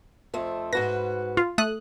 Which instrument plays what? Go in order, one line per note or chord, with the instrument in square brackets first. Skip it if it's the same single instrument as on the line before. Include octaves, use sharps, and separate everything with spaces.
[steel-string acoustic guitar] F2 A3 C4
[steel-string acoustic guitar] G#2 F#4 B4 [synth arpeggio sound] A#6
[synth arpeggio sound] F4
A3 D#6 F#6